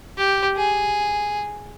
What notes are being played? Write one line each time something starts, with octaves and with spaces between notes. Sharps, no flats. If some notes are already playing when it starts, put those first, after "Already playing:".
G4
G#4